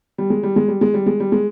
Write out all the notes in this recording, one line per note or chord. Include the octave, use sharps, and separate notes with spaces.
G3
G#3
G3
G#3
G3
G#3
G3
G#3
G3
G#3